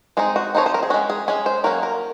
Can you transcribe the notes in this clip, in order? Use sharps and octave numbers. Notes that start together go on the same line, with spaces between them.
G#3 C4 D#4 G#4
F#4
F3 C4 D#4 C#5
C5
A#4
G#4
G#3 C#4 F#4
G#4
G#3 C#4 G#4
C5
F#3 A#3 C#4 A#4
A#4